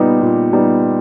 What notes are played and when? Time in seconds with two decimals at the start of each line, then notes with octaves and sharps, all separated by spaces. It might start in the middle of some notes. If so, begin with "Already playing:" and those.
Already playing: A#2 G3 B3 D#4
0.21 A#2
0.53 G3 B3 D#4